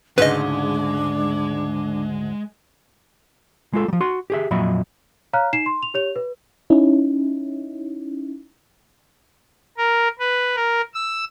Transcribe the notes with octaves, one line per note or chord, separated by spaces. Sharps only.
D2 G#2 C#3 G#3 D4 B4 D#5
G#3 F4 A4
F3 G3
F#4 C6
G4 G#4 E5
F2 A#2 F#3 D#5 E5 B5
C#5 F5 A#5 F6 F#6
D#4 C7 E7
C6
F7
G4 C#5 F7
B4
C#4 D#4 E4
A#4
B4
A#4
E6